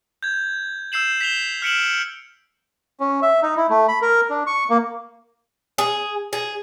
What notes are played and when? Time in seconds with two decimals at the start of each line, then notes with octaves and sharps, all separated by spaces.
0.23 G6 G#6
0.92 E6 G6 C7 E7 F#7
1.21 B6 E7 F7 G7
1.62 F6 B6 C#7 D7 E7 F#7
3.00 C#4
3.22 E5
3.42 D#4
3.57 E4
3.70 A3
3.88 B5
4.02 A#4
4.30 D4
4.47 C#6
4.70 A#3
5.78 G#4
6.33 G#4